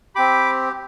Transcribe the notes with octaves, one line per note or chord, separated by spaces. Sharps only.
C4 G4 B5 D6